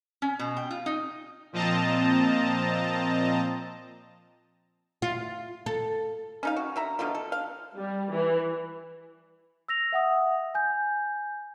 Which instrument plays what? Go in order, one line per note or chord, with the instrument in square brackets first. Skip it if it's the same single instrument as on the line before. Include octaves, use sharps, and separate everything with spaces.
[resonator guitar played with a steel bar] C#4
B2
G5
F4
D#4
[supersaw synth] A#2 F3 C4 D#5 A5 A#5
[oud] F4
A4
[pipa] C#4 D#4 F5
F#4
D3 E5 A#5
B2 D3 F3 F4
A4
F5
[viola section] G3
E3
[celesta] E6 A#6 F7
E5 F#5 D#6
G#5 G6